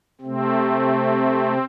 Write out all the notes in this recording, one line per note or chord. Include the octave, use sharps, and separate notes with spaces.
C3 A3 C4